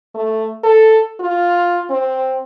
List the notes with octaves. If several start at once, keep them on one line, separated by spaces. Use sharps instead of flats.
A3
A4
F4
C4